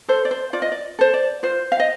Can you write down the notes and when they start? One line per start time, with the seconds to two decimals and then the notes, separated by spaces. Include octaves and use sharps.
0.08 A4 C5
0.25 D5
0.31 C5
0.53 F4 D5
0.62 D#5
0.72 D5
0.99 A4 C5
1.14 D5
1.43 F4 C5
1.72 F5
1.80 D#5